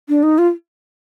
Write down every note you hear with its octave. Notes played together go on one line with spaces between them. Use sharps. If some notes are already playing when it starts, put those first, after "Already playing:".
D4
D#4
F4